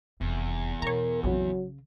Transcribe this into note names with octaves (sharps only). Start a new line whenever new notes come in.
F1 E2
B2 A#4 C#5 A#5
A#1 F2 C#3 F#3